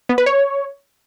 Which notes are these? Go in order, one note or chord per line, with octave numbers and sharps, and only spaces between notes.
B3
B4
C#5